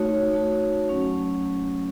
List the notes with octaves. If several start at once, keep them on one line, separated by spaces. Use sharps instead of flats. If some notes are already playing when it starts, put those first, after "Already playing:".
Already playing: A3 D#4 F#4 C#5
A3 D#4 F#4 A5
F#3 A3 C#4